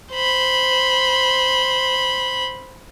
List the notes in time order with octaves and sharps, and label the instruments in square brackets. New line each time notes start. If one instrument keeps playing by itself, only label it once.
[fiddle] C5 B5